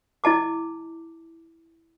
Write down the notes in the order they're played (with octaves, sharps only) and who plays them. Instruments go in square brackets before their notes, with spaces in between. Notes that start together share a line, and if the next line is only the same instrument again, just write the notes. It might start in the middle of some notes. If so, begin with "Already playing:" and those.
[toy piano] E4 D#5 A5 D6